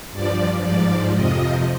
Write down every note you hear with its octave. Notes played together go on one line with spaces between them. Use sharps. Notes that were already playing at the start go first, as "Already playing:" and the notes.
G2 F3 D5
G#2 F3 D5
F2 C3 F3 D#5